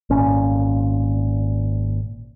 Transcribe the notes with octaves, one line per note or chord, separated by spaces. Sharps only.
G#1 A#2 C#4